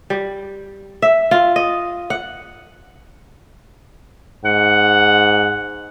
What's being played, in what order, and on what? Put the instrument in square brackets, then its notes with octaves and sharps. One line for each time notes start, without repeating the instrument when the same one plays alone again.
[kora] G3
E5
F4
D#5
F#5
[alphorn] G#2 [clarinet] F#5